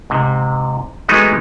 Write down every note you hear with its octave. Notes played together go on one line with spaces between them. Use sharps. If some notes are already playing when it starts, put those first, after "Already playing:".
G#2 C3
E3 F#3 G#3 A3 B3 D#4